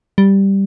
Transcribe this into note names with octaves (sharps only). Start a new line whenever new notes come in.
G3